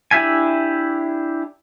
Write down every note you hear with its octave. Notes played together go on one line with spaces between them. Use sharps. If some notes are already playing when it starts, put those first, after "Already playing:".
D4 E4 G4 E5 G#5